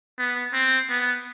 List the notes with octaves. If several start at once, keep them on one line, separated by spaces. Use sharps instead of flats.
B3
C4
B3